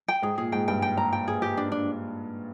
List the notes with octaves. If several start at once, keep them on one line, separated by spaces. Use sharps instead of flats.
G5
G#2 G#4
A#2 G#4
G#2 G5
G2 G5
G5
A#5
G5
G#4
G4
D4
D4